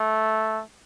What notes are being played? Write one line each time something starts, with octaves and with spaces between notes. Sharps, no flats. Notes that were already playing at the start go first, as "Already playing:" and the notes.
Already playing: A3